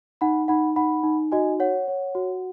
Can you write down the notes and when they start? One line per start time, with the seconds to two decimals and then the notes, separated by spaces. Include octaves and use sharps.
0.21 D#4 F#5 B5
0.48 D#4 F#5 B5
0.76 D#4 F#5 B5
1.03 D#4
1.32 F#4 D#5 G#5
1.60 C#5 F#5
1.88 C#5
2.15 F#4